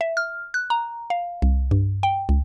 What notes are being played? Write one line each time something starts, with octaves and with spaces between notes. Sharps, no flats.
E5
F6
F#6
A#5
F5
C2
G2
G5
C#2